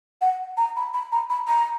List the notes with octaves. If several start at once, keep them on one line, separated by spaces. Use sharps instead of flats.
F#5
A#5
B5
B5
A#5
B5
A#5